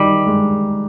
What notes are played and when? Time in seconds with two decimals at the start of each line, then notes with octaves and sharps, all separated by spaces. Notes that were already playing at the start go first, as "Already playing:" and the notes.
Already playing: D#3 G3 D#4
0.27 G#3